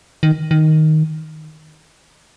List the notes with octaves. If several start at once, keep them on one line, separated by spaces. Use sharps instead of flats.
D#3
D#3